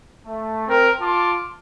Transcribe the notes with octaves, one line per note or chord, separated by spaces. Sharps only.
A3
C4 A#4
F4 A5 C6 D6